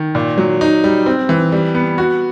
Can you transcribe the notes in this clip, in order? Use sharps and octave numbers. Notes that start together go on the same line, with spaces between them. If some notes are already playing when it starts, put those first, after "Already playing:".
Already playing: D#3
A#2
F#3
D#4
G3
C4
E3
G3
B3
F#4